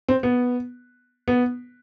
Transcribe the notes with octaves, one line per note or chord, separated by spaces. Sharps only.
C4
B3
B3